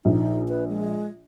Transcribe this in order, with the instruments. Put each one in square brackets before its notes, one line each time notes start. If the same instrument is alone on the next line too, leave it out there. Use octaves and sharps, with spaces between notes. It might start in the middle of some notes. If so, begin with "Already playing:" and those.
[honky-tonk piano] A#1 [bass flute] D#4
[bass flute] B4
G#3